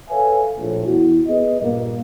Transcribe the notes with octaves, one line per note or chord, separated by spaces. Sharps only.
A4 B4 C#5 E5 F5 G#5
A#1 A2
E2 E4 F#4
B3 G#4 B4 D#5
G2 A#2 A#3